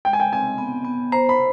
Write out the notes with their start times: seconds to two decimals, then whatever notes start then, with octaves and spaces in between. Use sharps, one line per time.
0.05 G#3 G5
0.13 G#5
0.20 G5
0.32 C4 G#5
0.58 B3
0.85 B3
1.12 C5 A#5
1.29 B5